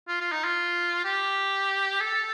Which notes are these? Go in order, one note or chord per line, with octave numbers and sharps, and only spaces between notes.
F4
F4
D#4
F4
G4
A4